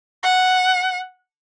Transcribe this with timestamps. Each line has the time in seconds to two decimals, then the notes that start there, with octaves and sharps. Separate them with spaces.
0.23 F#5